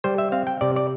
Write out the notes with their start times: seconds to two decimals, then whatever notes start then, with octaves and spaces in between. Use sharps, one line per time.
0.04 G3 C5
0.18 E5
0.32 C4 F5
0.47 G5
0.61 C3 D5
0.76 D5